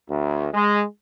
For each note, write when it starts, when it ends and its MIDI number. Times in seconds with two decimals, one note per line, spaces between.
0.10 0.49 38
0.54 0.84 56